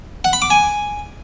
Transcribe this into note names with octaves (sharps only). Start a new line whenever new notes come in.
F#5
B5
D6
G#5